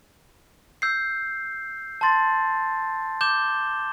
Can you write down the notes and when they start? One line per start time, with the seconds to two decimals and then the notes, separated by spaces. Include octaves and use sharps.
0.82 E6 G6 C7
2.01 A5 C6 A6
3.21 D6 G6 E7 G7